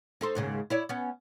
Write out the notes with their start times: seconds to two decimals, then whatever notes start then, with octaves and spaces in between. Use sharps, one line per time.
0.21 D#4 A4 C5
0.35 D#2 G#2 C#3
0.70 E4 C#5 D5
0.89 B3 C#4